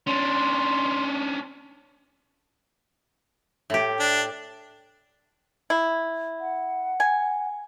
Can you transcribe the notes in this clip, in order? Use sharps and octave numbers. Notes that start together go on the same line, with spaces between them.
C#4 D4 C6
A2 G4
D4
E4
F#5
G#5